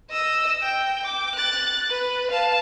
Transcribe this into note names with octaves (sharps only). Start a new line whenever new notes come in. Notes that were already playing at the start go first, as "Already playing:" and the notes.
D#5 E6
G5
D6
F#6 A6
B4
F5 A5